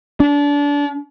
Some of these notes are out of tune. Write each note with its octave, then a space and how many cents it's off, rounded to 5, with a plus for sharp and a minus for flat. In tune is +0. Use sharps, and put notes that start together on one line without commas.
D4 -30